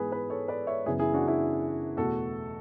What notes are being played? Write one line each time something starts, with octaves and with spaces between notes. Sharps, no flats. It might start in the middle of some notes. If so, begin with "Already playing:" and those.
Already playing: G#2 E3 G#3 B3 G#4 B4
G#4 B4
A4 C#5
B4 D5
C#5 E5
F#2 C#3 E3 B3 E4 G#4
E4 G#4
D4 F#4
E4 G#4
E2 B2 A3 F#4 A4